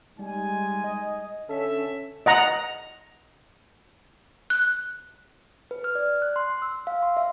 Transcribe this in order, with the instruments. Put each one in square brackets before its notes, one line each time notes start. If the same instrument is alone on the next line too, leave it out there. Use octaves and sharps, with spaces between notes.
[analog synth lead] G3 [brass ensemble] G#3 D#4 G#5
[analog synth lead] D#5
[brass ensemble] D3 C#4 E5 [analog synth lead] A4
[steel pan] D#5 F#5 A#5
[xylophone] F#6
[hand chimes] B4
F6
D5
F#6
C6
E6
F5
C6
E5